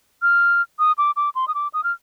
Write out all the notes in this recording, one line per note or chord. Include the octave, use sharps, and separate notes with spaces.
F6
D#6
D6
D6
C6
D#6
D6
D#6
F6